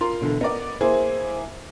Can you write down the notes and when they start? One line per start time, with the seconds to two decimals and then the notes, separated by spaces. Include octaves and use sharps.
0.01 F4 A#4 C6
0.21 B2 D3 E3
0.41 B3 A#4 D5 D#5
0.81 A#3 E4 G#4 C5